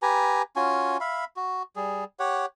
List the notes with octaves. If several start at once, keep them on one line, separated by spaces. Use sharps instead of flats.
G4 B4 G#5 A#5
C#4 F4 F#4 G#5
E5 F5 B5
F#4
G3 G#4
G4 C#5 F#5